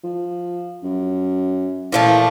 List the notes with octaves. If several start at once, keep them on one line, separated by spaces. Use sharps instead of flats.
F3
F#2
A#2 E3 F3 A3